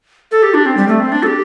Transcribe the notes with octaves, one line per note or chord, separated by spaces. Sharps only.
A4
G4
D4
C4
G3
A3
C4
D4
A4
G4